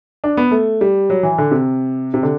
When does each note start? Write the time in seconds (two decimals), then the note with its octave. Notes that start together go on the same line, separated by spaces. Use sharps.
0.24 D4
0.37 B3
0.51 A3
0.81 G3
1.10 F#3
1.23 E3
1.38 D3
1.51 C3
2.14 C3
2.23 D3